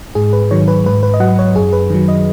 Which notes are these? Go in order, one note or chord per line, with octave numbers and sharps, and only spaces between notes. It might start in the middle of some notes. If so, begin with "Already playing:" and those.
G#2 G#4
B4
D#3 F#3 C#5
B4
G#2 B4
B4
D#5
F#3 F#5
C#5
F#2 G#4
B4
D#3 F#3
D#5